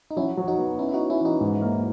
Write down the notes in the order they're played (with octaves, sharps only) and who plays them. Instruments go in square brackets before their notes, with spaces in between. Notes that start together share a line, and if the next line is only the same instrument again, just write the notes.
[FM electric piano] D#4
[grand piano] F#3 [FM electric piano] C#4 E4
[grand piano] F#3
[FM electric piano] D#4 F#4
[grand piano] B3
[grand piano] B3 [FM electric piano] C#4 E4
[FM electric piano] E4
D#4 F#4
[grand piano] C#5
[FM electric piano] C#4 E4
[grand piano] E3 [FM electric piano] D#4 F#4
[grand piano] G#2
A#3